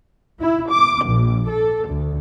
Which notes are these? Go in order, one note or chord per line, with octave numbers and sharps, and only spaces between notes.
E4
D6
A#1
A4
D2